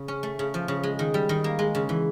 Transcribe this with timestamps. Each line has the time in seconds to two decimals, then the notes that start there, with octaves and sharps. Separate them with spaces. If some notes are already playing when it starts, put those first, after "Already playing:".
Already playing: C#3
0.08 C#4
0.23 A3
0.39 C#3
0.54 F3
0.68 C#3
0.83 G#3
0.99 D#3
1.14 G3
1.29 D#3
1.44 A#3
1.59 G#3
1.75 C#3
1.89 E3